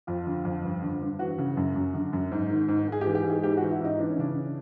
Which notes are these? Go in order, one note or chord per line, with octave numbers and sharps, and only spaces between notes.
F2 F4
D3
F2
G2
D3
G2
E3 F#4
C#3
F#2
F#2
D3
F#2
G#2
D#3
G#2
G#2 G#4
E3 G4
G4
G#2
G#4
G#2 G4
E3 F#4
E4
G#2 D#4
E3 D4
C#4
C#3 D4